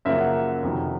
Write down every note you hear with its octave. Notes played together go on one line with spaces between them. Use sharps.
F#2 C#3 F3 A#3 E5
F#5
F#5
F2 C3 D#3 F#3